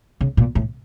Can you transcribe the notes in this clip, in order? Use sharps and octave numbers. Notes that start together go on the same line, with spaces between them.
C#3
A#2
A2